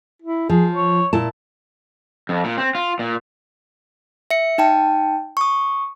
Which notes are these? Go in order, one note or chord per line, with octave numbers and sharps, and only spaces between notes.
E4
F3 G#4
C#5
A#2 E4 A5
F2
A#2
C4
F4
A#2
E5 C#7
D#4 G5 A5
C#6 D#6